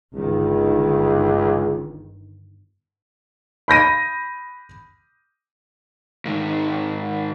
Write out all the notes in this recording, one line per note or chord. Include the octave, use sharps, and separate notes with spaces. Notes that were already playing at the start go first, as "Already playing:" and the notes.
G1 C#2 D#3
B5 G6 A#6 D#7
G#2 D#3